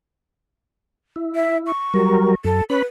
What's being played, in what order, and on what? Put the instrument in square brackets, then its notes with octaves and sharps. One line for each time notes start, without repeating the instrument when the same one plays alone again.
[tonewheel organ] E4
[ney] E5
C#6
[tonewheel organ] F#3 G3 A#4
[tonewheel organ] F#2 [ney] A4
[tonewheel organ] C#4 B5 F#6 [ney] B4